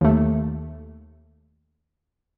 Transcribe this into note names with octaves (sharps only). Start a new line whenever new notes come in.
D#2 A3